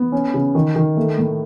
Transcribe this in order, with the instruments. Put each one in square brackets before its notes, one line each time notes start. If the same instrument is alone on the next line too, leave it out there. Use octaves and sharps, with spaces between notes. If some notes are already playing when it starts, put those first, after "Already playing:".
Already playing: [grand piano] B3
C#4
C#3
D#3
D#3
A3
A2